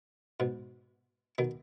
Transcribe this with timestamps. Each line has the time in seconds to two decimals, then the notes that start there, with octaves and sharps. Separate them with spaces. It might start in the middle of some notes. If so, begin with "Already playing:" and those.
0.40 G#2 B2
1.38 B2 D#3